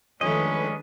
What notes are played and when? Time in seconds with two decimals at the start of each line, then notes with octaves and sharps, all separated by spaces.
0.21 F2 D#3 G#3 A3 C#4 D4 B4 D#5